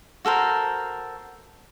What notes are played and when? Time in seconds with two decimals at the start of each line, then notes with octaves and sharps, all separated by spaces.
0.25 F#4 A4 A#4 C5